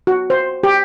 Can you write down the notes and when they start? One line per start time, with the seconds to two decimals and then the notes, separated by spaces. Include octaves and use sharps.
0.07 F#4
0.30 C5
0.63 G4